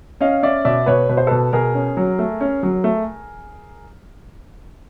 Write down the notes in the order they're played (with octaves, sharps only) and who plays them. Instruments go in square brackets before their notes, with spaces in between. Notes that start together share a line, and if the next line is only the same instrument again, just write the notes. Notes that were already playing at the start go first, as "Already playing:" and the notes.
[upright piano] C#4 D#5 F5
C#4 D5 E5
B2 D5 E5
B2 B4 C#5
B2 B4
C5
B2 A4 B4
B2 G#4 A#4
C#4
F#3
A3
C#4
F#3
A3